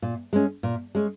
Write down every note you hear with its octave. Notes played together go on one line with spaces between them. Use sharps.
A#2
G#3 C#4
A#2
G#3 C#4